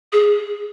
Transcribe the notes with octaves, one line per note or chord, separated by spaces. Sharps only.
G#4